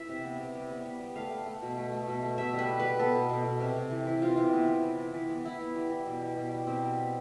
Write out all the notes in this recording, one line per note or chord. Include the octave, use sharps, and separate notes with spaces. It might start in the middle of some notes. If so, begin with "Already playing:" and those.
Already playing: E3 E5
C3
B3
C3
G3
B3
B3
G3
A3 F5
A3
A3
B2
A3
A3
B2
A3
B2 E5
G3
B4
B3
B4
G3
B3 A4
B2
B2
B2
C3
C3
E3
E3
C3 F4
C3
B3
E3
E3
E3
E3
B3
E3 E4
B3
G3
E3
B2
G3
B2
G3
B2 C4
G3
B3